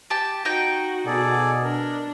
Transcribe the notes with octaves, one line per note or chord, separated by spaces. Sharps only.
G4 A5
D#4 F#4 G5
B2 G#4 A4 D5
D4 A#4